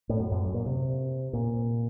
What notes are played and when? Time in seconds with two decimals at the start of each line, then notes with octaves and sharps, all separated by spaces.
0.09 A2
0.20 F#2
0.32 F#2
0.54 A#2
0.66 C3
1.33 A#2